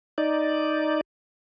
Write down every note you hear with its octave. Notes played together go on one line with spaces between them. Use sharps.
D#4 D5